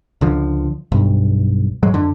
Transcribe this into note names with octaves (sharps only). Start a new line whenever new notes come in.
C#2 D3 F3
B1 G2
G#2 F#3 G#3
F2 D3